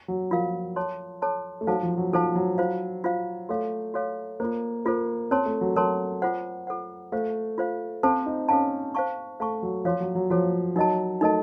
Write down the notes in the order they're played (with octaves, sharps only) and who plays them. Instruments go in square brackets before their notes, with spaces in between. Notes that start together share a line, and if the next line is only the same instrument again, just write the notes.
[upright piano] F#3
[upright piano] F3 [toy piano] F4 A#4 F5
[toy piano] A4 C#5 A5 C6
A4 C#5 A5 C6
[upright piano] A3
[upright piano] F#3 [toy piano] D#4 A4 C5 F5 A5
[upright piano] F3
F#3
[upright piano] F3 [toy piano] D#4 A4 C5 F5 A5
[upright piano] F#3
[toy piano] F4 C5 F5
F4 C5 F5
[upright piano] A3 [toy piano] F#4 A4 C#5 F5
[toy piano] F#4 A4 C#5 F5
[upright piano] A#3 [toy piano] F4 A4 C5
[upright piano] A#3 [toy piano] F4 A4 C5
[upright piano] C4 [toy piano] A#4 C#5 A5 C6
[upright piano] A3
F#3
[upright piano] F#3 [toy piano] A#4 C#5 A5 C6
[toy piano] F4 A4 C5 F#5
F4 A4 C5 F#5
[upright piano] A3 [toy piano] F4 C5 F5
[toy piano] F4 C5 F5
[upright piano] C4 [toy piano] A4 C5 F5 A5
[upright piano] D#4
[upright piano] C#4 [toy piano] A4 C5 F5 A5
[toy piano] C5 F5 A5 C#6
[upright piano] A3 [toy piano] C5 F5 A5 C#6
[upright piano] F#3
[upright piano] F3 [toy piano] F#4 A4 C#5 F5
[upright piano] F#3
F#3
[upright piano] F3 [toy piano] F#4 A4 C#5 F5
[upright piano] F#3 [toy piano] D#4 A#4 D#5 A5
[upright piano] A3 [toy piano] D#4 A#4 D#5 A5